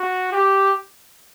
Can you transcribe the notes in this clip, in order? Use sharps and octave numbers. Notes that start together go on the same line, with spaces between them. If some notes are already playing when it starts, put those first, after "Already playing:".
Already playing: F#4
G4